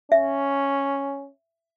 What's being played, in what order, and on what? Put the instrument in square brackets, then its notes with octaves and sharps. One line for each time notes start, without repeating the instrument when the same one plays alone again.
[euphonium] C#4 [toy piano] E5